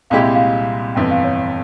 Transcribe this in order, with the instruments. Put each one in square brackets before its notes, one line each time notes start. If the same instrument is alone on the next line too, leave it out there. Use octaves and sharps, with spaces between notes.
[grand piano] C2 A#2 G#3 E4 G4 [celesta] F5
[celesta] E5
F5
[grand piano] G1 F2 E3 [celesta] G5
[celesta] F5
C#5